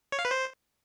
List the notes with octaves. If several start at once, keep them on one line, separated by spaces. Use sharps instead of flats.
C#5
F5
B4
C5